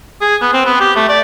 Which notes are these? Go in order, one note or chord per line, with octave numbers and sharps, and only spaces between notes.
G#4
B3
C4
B3
G4
A3
D5